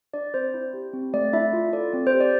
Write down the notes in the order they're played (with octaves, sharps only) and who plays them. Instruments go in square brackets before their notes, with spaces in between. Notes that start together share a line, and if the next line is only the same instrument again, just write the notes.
[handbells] D4 D5
C4 C5
E4
G4
C4
A3 D5
D4 E4 E5
F4
A4 D5
C4 D5
C5
G4
D5